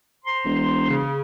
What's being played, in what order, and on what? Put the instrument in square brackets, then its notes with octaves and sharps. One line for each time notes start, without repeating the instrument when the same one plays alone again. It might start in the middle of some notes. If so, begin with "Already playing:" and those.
[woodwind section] C5 A#5 C6
[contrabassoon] E1
[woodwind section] C#3